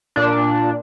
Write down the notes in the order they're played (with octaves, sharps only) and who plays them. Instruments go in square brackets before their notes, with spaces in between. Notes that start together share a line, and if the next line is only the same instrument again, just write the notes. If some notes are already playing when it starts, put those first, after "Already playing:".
[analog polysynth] A#2 D4